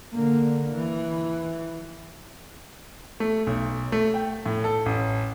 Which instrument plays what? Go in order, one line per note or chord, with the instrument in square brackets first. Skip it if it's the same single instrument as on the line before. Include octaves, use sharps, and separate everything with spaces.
[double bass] D3 A#3
E3
[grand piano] A3
B1
A3
G5
A2
A4
A1